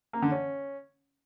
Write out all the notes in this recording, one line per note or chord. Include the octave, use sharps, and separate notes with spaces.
A#3
D3
C#4